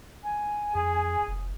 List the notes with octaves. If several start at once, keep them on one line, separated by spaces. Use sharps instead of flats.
G#5
F2 G#4
F1